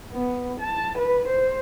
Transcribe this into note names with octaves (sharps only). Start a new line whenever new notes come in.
B3
A5
B4
C5